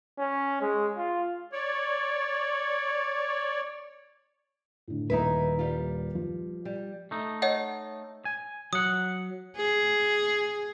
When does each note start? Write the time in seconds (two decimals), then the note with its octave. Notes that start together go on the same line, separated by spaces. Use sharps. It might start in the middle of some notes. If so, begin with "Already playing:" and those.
0.19 C#4
0.61 G#3
0.97 F4
1.52 C#5 D5
4.87 A2 D3
5.10 D#1 D#4 E4 B4 A#5
5.59 G3 F4
6.15 F3
6.65 G3
7.11 A3 D#4
7.42 C#5 D#5 F#5
8.25 G#5
8.73 F#3 F#5 D#6
9.57 G#4